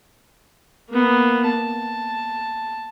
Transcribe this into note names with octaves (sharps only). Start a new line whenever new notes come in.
A#3 B3
A5